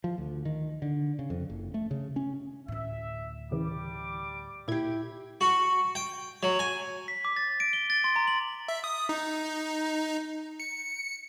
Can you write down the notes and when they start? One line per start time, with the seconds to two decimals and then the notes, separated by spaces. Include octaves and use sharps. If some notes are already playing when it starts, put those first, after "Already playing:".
0.04 F3
0.18 D2
0.45 D#3
0.82 D3
1.19 C#3
1.30 F2
1.50 F#1
1.74 A3
1.91 C#3
2.16 C#4
2.68 D2 A2 E5
3.51 C2 C#3 E3 G3 D6
4.68 A#2 E4 G4 G#6
5.41 F#4
5.95 G5
6.43 F#3
6.59 G#5
7.08 B6
7.25 D6
7.37 A6
7.60 D7
7.73 G7
7.90 A6
8.04 C6
8.16 A#5
8.27 F#7
8.68 E5
8.84 D#6
9.09 D#4
10.60 C#7